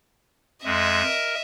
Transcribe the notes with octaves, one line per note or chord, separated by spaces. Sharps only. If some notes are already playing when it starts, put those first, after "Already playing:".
F2 G#3 D#5 E5
A#4